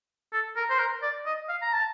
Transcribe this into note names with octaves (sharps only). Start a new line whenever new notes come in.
A4
A#4
C5
A#4
D5
D#5
F5
A#5
A5